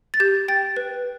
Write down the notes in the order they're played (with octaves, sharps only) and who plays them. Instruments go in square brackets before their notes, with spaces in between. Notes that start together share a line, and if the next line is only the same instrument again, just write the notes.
[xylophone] A6
G4 G6
G5 A6
B4